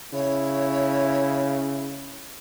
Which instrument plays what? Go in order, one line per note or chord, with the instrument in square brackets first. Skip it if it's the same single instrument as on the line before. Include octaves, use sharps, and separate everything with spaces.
[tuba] C#3 [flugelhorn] E4 [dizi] C#5